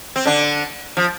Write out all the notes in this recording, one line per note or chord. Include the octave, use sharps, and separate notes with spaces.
C4
D3 D4
F3